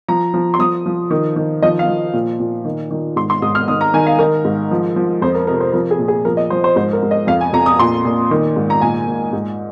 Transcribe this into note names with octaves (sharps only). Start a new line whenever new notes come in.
F3 A#5
F3
C6
F3 D#6
F3
D#3
D#3
F3 D#5
F5
F3
A#2
A#2
D#3
D#3
G#2 C6
C6
G#2 D#6
F6
D#3 D#6
A#5
D#3 G#5
F5
D#3 A#4
G#2
F3
F3
F2 C5
A#4
C3 A#4
C5
F3 A#4
G#4
A#2
G#4
F3 A#4
D#5
F3 C5
C5
G#2 C5
A#4
G#2
D#5
F2 F5
G#5
F2 A#5
D#6
A#2 C6
A#2
D#3
G#2
A#5
A#2 G#5
A#2
G#2